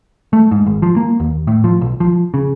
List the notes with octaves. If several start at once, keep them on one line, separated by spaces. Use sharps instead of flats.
A3
G#2
G#1
F3
A#3
D#2
A2
F3
B1
F3
C#3